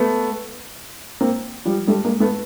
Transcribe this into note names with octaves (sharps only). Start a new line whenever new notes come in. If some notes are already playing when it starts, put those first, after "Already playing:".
Already playing: A3 B3
A#3 C4
F3 G3
G3 A3
G#3 A#3
A3 B3